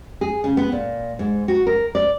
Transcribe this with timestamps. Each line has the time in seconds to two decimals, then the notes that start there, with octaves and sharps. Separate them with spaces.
0.21 G#4
0.44 C#3
0.57 B3
0.72 A#2
1.19 G#2
1.48 F#4
1.67 A#4
1.95 D5